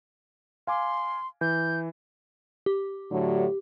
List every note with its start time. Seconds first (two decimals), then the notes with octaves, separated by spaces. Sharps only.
0.67 F5 G#5 C6 D6
1.41 E3 G6
2.66 G4
3.11 A2 D3 F#3